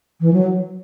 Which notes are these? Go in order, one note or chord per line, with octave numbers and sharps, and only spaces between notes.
E3
F#3